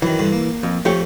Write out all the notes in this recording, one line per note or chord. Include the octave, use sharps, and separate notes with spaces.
F#2 D#3 E3
G2 D3
A#3
F2
F2 F3 A3 G4 C#5